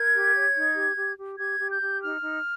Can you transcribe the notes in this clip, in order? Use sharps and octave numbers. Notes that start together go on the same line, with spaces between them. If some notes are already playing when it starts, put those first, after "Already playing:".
Already playing: A#4 G#6
G4
C#5
D#4
G4
G4
G4
G4 G#6
G4
G6
G4
D#4 F6
D#4